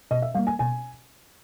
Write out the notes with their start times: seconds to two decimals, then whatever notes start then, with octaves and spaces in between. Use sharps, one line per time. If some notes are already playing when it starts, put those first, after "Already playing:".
0.11 B2 D#5
0.22 E5
0.34 G3 A#3 F5
0.47 G#5
0.59 B2 G#5